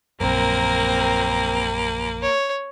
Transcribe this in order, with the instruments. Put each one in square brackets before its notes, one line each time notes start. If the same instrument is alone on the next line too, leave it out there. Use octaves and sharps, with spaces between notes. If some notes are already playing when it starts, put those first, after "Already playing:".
[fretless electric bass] A#1 F#2 [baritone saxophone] A#3 [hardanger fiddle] C4 A#4
[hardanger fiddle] C#5